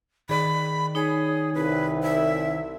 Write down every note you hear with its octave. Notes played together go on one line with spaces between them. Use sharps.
D#3 G#4 D5 B5
D#4 G#4 C#5
C2 B4
E5